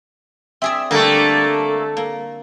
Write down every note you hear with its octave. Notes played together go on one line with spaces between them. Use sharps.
C4 G#4 D5 E5
D3 G3 A3 A#3 A4
A#3